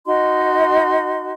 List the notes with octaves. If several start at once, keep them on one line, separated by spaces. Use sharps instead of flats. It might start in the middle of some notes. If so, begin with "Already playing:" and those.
D#4 F#4 D#5 C6